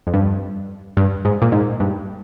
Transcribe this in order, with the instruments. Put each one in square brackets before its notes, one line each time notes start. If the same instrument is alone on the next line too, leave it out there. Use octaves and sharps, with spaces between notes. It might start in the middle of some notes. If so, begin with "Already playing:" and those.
[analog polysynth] F2
G2
G2
G#2
A#2
G#2
G2